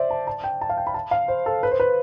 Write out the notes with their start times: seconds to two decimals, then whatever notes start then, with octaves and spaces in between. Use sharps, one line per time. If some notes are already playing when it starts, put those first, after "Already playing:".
Already playing: C5 D5 E5
0.10 A5
0.27 A5
0.44 G5
0.61 A5
0.69 F5
0.77 G5
0.87 B5
0.94 A5
1.11 F5
1.28 C5
1.46 A4
1.63 B4
1.71 C5
1.80 B4